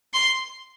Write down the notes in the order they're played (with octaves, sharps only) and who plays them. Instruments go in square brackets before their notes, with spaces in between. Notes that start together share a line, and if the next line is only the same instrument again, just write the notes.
[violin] C6